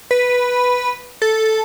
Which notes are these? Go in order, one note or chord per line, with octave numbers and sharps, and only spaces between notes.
B4
A4